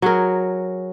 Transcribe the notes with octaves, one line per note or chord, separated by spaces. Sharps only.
F#3 F#4 G#4 A#4